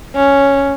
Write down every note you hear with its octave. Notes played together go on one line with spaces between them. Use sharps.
C#4